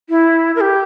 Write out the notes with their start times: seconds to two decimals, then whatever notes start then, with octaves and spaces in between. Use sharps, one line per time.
0.10 E4
0.56 A#4
0.61 G4